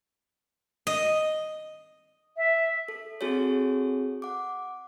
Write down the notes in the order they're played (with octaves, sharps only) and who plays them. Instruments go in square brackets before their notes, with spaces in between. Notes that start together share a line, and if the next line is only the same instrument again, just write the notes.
[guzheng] D#5
[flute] E5
[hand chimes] A4
C4 F#4 G#4 A4 C#5
F#5 D6